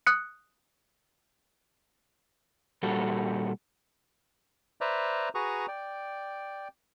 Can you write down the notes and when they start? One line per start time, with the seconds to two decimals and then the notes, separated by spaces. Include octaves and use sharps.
0.06 D#6 F#6 C#7
2.83 A#2 G3 F#4 A4
4.81 B4 C5 D5 E5 A#5
5.35 F#4 G#4 B4 A#5 C#6 D#6
5.68 D5 G5